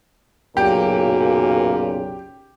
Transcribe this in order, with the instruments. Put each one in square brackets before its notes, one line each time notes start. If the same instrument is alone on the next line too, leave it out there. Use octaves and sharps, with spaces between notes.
[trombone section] B1 F#2 C#3 [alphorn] A#2 [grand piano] G4